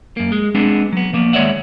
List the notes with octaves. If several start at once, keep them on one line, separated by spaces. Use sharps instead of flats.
F#2 A#3
G#3
G#3 B3 C4 D4 G#4
F#3 B3
F3 A#3 B3
D#2 G#3 C#5 D5 E5 F#5